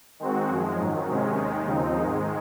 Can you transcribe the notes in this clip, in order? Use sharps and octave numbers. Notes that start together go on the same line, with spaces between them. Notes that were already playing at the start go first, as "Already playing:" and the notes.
D#3 G#3 C4 F#4
F#2 F3 G#3
G#2 D#3 F#3
C3 D#3 G#3 C#4
D#2 D#3 G#3
D#2 C#3 F3 C4 D#4
G#2 D#3 G#3